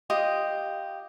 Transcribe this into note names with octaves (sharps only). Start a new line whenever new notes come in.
F4 G4 D#5 D#6